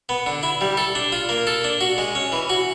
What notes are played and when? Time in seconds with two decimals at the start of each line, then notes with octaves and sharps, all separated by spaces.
0.09 B3
0.26 D3
0.43 E4
0.61 G3
0.77 A4
0.95 D4
1.12 F4
1.29 A#3
1.47 A4
1.64 D4
1.81 F#4
1.98 G#3
2.15 C#4
2.32 E3
2.49 F#4